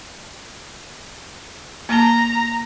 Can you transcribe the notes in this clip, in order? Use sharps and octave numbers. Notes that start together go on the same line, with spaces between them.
A#3 A5 A#5